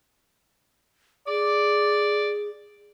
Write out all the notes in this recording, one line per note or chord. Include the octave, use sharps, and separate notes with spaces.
G#4 D5 D6